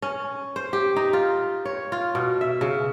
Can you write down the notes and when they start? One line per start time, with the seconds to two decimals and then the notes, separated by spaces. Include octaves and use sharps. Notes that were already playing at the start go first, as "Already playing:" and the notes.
0.02 C#4
0.56 C5
0.73 G4
0.96 D#4
1.13 F4
1.65 C#5
1.92 F4
2.15 B2
2.41 E5
2.61 C#3